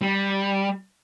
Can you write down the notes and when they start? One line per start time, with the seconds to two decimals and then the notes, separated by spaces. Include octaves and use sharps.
0.02 G3